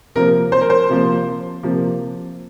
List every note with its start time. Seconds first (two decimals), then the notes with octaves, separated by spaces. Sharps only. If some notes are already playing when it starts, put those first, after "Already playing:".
0.15 C3 F3 A#3 A#4
0.52 C5
0.61 A#4
0.70 C5
0.89 C3 F3 A#3
1.63 C3 F3 A#3